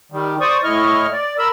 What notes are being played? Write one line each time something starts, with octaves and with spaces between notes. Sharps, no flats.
D#3 G3
C5 D5 C#6 D#6
A2 E4 D#5 C#6 F6
D5
A#4 B5 E6